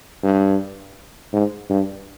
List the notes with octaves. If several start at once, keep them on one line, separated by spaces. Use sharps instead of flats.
G2
G#2
G2